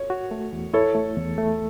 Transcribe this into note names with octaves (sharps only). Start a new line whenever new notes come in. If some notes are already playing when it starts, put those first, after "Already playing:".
Already playing: C#5
F#4
A3
E2
E4 A4 C#5
A3
E2
A3